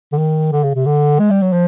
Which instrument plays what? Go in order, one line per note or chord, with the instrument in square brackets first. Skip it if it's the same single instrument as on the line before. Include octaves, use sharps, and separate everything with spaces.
[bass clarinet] D3
D#3
D3
C#3
C3
D3
G#3
G3
F#3
F3